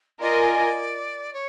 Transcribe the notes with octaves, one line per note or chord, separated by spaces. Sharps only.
F4 A#4 D5 D#5 G#5
C#5